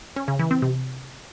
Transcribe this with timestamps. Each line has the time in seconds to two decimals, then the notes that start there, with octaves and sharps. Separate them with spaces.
0.16 C#4
0.28 C#3
0.39 E3
0.51 C4
0.62 C3